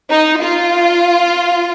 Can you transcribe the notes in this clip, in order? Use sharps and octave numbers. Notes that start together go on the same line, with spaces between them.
D#4
F4